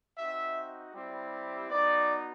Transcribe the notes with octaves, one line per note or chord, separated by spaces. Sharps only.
C4 D#4 F#4 E5
G3 C4 E4 G4
B3 D#4 F#4 D5